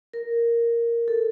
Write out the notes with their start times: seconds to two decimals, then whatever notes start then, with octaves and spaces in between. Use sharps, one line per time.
0.14 A#4
1.08 A4